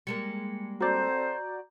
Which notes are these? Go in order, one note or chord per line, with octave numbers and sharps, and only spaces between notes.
G3 G#3 A#3 C#7
C4 F#4 A4 C5 D5 A#5 G6